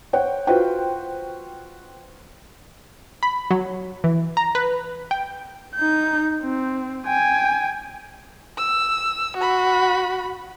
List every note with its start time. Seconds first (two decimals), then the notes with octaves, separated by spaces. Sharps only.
0.13 C5 C#5 F#5 G5
0.47 F4 F#4 B4 C5 G5
3.23 B5
3.51 F#3
4.04 E3
4.37 A#5
4.55 B4
5.11 G5
5.75 D#4 G6
6.41 C4
7.07 G5 G#5
8.58 E6
9.37 F#4 B5